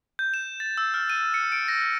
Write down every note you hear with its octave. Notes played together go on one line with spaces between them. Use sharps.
G6
E7
A6
E6
F6
D#7
C#7
D7
A#6